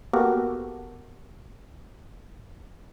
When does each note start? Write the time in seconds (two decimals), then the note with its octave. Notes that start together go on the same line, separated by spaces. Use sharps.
0.13 A#3 B3 F#4 G4 A4 A#4